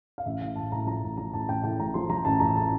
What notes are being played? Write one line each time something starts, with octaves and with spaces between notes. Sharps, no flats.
F5
A1 E5
A2 F5
A1 A5
A2 A#5
F3 A#5
A1
F3 A#5
A1 A5
A1 G5
A2 G5
A1 A#5
F3 C6
F3 A#5
A1 A5
A1 A#5
A5